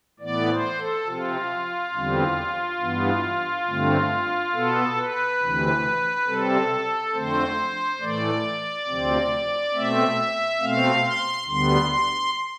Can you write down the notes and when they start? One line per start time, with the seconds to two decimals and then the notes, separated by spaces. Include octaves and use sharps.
0.20 A2 E3 B3 D5
0.49 C5
0.78 A4
1.06 C3 F3 C4 F4
1.94 E2 D3 G3 C4
2.80 G2 E3 B3
3.67 G2 D3 A3 C4
4.54 B2 B3 A4
4.97 B4
5.40 D2 C3 E3
6.27 C3 G3 C4 A4
7.13 F2 D3 A3 C4 C5
8.00 A2 E3 A3 D5
8.87 D2 C3 F3 C4
9.74 B2 A3 C4 E5
10.60 B2 A3 C4 F5
11.04 C6
11.47 D2 D3 G3 B3 C6
11.91 C6